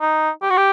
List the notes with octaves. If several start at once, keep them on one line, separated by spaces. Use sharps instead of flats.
D#4
G4
F#4
G4